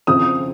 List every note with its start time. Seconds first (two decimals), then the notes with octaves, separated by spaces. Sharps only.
0.07 F2 C#3 F3 C4 D#6